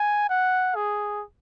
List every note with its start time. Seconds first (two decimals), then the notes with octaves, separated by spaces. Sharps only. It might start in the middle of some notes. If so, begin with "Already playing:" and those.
Already playing: G#5
0.30 F#5
0.75 G#4